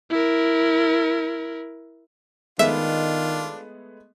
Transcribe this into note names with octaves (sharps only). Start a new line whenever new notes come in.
E4 A#4
D#3 G#3 A3 B3 D4 F4 E5